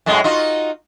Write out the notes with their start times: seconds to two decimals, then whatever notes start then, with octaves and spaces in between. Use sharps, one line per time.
0.06 F#2 A2 G#3
0.24 D#4 F4 F#4